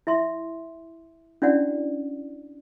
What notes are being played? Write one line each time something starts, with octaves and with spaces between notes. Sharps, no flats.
E4 E5 C6
C#4 D4 E4 F#4 D5 F#5